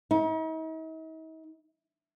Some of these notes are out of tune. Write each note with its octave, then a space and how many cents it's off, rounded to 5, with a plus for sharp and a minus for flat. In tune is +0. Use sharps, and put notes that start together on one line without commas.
D#4 +45